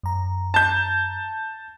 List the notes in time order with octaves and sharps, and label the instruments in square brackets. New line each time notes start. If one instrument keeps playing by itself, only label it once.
[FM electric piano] F#2 A#5
[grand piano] A5 G6